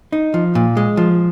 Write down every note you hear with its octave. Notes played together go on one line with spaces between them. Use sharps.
D#4
F3
A#2
G#3
F3